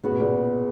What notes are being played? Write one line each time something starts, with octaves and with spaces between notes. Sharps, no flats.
C#3 B3 F#4 B4
B2
A#2 C#3